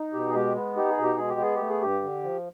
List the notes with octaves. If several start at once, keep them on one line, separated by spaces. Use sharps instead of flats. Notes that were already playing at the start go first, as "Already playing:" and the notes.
Already playing: D#4
B2 G4
G#4
G#3 G4
B3
D#4 G4
G#4
B2
G4
G#3 G#4
G4
B3 G#4
A3 G4
G#4
G2 G4
D3
F3